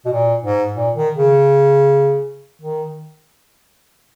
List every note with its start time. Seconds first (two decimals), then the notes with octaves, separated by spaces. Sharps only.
0.05 B2
0.13 A#2
0.44 G#2
0.75 A#2
0.95 D#3
1.16 C#3
2.62 D#3